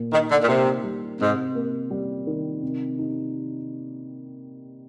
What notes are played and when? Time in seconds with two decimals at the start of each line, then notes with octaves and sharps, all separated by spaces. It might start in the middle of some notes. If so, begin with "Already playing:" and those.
Already playing: A#2
0.12 D#3 D#4
0.30 D3
0.42 A#2
0.47 C3 A#3
0.83 G3
1.19 G#2 C3
1.55 A#3
1.90 G3
2.27 D#3
2.63 C3
2.99 D#4